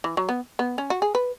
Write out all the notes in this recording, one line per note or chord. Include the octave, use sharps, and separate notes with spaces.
E3
F#3
B3
B3
C#4
F#4
G#4
B4